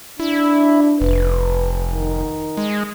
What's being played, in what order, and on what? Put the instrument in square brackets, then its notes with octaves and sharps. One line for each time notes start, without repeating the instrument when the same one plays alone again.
[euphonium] D4 [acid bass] E4
[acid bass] F1 [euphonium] B4
[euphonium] D#3
[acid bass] G#3